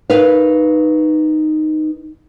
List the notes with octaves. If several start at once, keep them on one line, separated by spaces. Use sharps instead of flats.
D#4 A#4 B4 F5